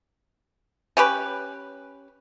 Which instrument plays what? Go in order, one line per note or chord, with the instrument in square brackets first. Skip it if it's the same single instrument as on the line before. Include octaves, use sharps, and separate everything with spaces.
[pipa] C#4 G4 B4